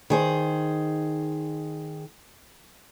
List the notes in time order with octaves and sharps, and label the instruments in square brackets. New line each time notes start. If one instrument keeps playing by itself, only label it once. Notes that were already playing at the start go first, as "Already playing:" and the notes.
[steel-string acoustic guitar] D#3 G#4 C5